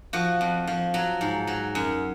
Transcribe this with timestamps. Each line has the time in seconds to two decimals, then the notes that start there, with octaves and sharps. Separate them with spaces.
0.13 F3 F#4
0.41 F2
0.67 F3
0.94 F#3
1.21 G#2
1.47 F#3
1.75 F#2